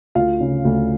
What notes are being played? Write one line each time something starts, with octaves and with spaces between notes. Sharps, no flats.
D2 F4 F5
C#3
D2